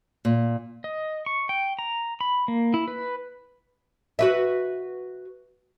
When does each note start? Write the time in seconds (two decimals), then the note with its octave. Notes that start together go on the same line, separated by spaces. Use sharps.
0.25 A#2
0.84 D#5
1.26 C#6
1.49 G5
1.79 A#5
2.21 B5
2.48 A#3
2.74 E4
2.88 B4
4.19 F#4 B4 E5